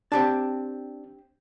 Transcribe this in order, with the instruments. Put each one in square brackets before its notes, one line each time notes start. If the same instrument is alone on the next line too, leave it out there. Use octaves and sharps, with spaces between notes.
[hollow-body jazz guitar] C4 G4 A5 [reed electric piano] D4